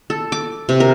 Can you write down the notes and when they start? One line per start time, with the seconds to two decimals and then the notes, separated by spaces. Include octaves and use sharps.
0.10 A4
0.32 D6
0.69 C3
0.80 A#4